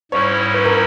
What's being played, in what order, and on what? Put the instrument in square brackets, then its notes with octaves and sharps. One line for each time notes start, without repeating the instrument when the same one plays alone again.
[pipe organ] G#2 G3 C#4 E4 [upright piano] C#5
[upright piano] B4
A#4